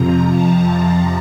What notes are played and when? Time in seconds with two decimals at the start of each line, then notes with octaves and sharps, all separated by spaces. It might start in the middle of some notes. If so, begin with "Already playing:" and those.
Already playing: F2 C3 F3 A#5
0.27 A5